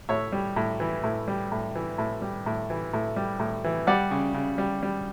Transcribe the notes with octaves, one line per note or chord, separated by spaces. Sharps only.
A2 C#5 E5
G3
A2
E3
A2
G3
A2
E3
A2
G3
A2
E3
A2
G3
A2
E3
G3 D5 F#5
C#3
C#3
G3
G3